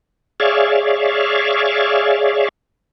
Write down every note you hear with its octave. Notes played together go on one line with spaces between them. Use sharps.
G#4 C#5 D5 E5 F5